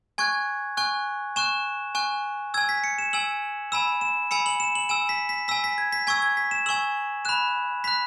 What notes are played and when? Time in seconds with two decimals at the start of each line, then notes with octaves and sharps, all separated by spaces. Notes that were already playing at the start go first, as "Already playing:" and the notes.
0.18 G#5 C#6 F#6 G#6
0.77 G#5 C#6 F#6
1.36 G#5 C#6 F#6 E7
1.95 G#5 C#6 F#6
2.54 E6 G#6
2.57 G#5
2.69 B6
2.84 C#7
2.98 E7
3.13 G#5 E6 F#7
3.72 G#5 B5 E6 E7
4.01 E7
4.31 G#5 B5 E6 C#7
4.46 F#7
4.60 E7
4.75 F#7
4.89 G#5 E6 E7
5.09 B6
5.29 B6
5.48 G#5 E6 B6
5.64 B6
5.78 G#6
5.93 B6
6.07 G#5 C#6 E6 G#6
6.22 G#6
6.37 B6
6.51 E7
6.66 G#5 C#6 E6 F#7
7.25 B5 F#6 E7
7.84 B5 F#6 B6